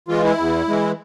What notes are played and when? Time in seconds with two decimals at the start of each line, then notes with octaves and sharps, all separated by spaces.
0.08 E3 G#3 F4
0.23 E4
0.38 E2
0.68 E3 G#3